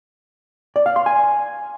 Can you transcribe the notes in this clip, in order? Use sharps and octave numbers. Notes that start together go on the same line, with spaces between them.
D5
F5
C6
G#5